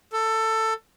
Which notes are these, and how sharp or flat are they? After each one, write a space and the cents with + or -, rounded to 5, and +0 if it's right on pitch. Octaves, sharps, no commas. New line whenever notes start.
A4 +15